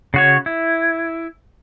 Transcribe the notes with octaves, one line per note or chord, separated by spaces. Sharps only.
C#3 F#4 C#5
E4